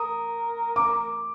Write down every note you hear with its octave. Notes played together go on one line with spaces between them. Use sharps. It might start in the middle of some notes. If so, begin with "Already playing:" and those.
Already playing: A#4 D#6
D6